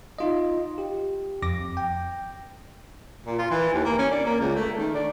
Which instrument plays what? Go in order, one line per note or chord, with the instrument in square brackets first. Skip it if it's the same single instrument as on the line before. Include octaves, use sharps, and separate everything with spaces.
[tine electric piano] D#4 F4 D#5
G4
F2 D6 A#6
G5
[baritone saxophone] A#2
F4
E3
D#2
A#3
C#4
D4
A#3
C#2
A3
D#3
D4